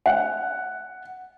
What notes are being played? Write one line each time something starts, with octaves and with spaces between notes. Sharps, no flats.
F#5